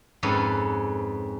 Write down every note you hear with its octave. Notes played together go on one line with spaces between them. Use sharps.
F2 G#2 C#4 A4 B4